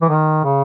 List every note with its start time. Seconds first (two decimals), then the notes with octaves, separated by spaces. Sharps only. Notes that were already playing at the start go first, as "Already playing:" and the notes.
0.02 E3
0.09 D#3
0.44 C#3